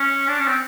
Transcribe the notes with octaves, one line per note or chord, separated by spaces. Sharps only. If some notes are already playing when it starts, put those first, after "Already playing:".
Already playing: C#4
D4
C#4
C4